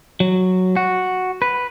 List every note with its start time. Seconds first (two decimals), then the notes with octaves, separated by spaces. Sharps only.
0.20 F#3
0.76 F#4
1.42 B4